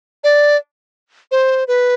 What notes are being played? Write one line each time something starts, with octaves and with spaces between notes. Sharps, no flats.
D5
C5
B4